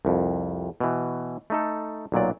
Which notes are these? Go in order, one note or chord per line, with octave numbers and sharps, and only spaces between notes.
C2 F2
B2 E3
A3 D#4 A4
B1 A#2 F#3 D5